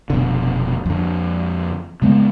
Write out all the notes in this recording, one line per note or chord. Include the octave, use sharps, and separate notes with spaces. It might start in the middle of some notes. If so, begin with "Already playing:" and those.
F1 B2 D3
F2 D3
C#3 G#3 B3